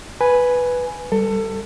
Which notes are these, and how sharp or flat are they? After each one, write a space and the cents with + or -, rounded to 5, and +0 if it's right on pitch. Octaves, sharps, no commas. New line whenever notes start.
B4 +0 G#5 +5
G3 +0 A4 +25